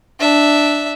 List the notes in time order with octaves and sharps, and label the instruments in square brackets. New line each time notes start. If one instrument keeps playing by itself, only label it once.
[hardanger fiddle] D4 E5